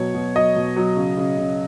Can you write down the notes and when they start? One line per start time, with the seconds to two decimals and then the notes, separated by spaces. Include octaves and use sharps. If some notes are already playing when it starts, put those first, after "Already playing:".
Already playing: B2 F#3 C#5
0.14 B2
0.35 F#3 D#5
0.56 B2
0.76 F#3
0.97 C#3
1.17 C#3
1.38 C#3